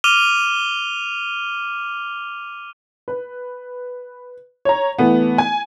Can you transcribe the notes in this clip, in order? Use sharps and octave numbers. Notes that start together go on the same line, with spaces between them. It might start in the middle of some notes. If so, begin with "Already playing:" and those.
D6 F6 D#7 F7 G7
B4
C#5 A#5
E3 A3 B3
G#5